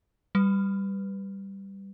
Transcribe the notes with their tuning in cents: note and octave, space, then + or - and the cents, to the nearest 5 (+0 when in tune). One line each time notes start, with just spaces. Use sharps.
G3 +0 B4 +0